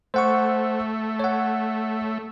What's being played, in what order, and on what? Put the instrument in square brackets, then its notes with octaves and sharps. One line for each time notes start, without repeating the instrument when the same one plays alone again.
[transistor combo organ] A3 [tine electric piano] C5 F#5 C#6
[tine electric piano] C#5 F#5